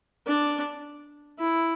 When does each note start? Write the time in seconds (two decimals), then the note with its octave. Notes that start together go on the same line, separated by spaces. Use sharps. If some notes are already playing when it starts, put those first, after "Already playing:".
0.27 D4
1.39 E4